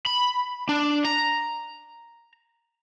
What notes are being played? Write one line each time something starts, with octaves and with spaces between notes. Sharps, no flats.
B5
D4
A#5